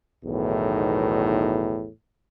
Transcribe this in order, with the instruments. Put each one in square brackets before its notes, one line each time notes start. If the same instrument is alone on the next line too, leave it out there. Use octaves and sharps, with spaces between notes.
[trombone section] B1 E2 A2 D#3